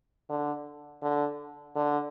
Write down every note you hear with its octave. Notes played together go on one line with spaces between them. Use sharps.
D3
D3
D3